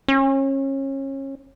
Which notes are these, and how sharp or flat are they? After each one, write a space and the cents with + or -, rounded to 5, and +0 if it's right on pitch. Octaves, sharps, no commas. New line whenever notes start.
C#4 -30